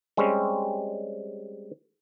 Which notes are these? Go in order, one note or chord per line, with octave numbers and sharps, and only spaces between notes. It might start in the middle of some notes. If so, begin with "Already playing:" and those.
G3 G#3 C4 C#4